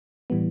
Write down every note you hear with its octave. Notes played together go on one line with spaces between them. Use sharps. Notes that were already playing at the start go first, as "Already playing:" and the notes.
A2 E3 G3 B3